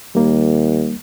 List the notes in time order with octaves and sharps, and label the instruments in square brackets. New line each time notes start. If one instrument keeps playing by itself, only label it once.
[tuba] D#2 [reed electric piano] G3 A#3